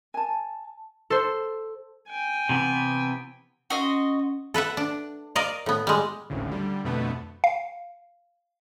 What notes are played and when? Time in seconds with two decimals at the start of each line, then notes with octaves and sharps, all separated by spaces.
0.14 G#5 A5
1.10 A4 C5
2.09 G5 G#5
2.49 C3 E3 B3
3.70 C#4 F#4 D#5 C6
4.54 A4 B4 E5 F#5
4.77 D4
5.35 A#4 D5 D#5 F5
5.66 A2 B3
5.87 G3 G#3
6.30 G#1 D2 A2 C#3
6.47 D3 G3
6.84 F2 B2 D3 A3 B3
7.44 F5